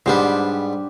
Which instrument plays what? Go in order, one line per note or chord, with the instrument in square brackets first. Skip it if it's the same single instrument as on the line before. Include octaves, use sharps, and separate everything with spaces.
[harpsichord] G#2 G3 B3 [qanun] D4 G4 C5